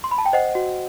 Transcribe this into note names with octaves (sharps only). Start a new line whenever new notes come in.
C6
B5
A5
G5
C5 D#5 F#5
F#4